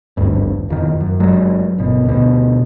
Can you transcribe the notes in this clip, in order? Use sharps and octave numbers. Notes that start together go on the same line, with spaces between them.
G#1 D2 G2
E1 F2 D#3
F#2
G1 F#3 G#3
G1 B2
D2 B2